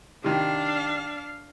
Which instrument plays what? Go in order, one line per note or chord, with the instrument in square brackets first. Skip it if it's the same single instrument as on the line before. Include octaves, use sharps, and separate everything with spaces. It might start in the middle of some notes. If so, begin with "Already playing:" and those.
[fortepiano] C3 D#3 [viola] D4 F5